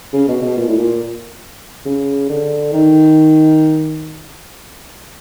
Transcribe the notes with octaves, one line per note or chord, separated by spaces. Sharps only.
C#3
B2
B2
A#2
A2
A#2
C#3
D3
D#3